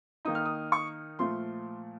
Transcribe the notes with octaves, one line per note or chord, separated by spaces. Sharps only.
D#3 A#3 D#4 D#6
F6
D#6
C#6
A#2 F3 A3 C6